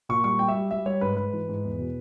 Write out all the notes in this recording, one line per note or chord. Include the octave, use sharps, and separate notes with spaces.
A#2 C#6
G3 C#6
G3 G5
E5
G3
G3 E5
G3 C#5
G#2 B4
G#2 B4
E3
G#2
E2
B2